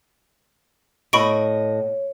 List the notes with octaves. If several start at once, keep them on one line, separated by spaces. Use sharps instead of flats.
A2 C#5 D#5 B5 C#6 D7